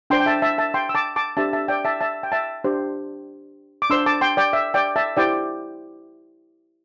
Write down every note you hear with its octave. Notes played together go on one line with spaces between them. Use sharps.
D4 C5 G5 C6
G5
E5 A5
E5 A5
E5 A5
G5 C6
E6
A5 D6
A5 D6
D4 G4 C5 E5 A5
E5 A5
D5 G5
E5 A5
E5 A5
G5
E5 A5
D4 G4 C5
D6
D4 C5 C6 E6
A5 D6
G5 C6
D5 G5
E5
D5 G5
E5 A5
E4 G4 C5 D5 G5